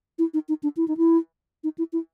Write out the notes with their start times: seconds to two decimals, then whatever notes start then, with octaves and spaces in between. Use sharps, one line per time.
0.19 E4
0.34 D#4
0.48 D#4
0.63 D4
0.77 E4
0.88 D#4
0.97 E4
1.64 D#4
1.78 E4
1.93 E4